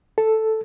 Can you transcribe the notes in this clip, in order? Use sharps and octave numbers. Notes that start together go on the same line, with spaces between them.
A4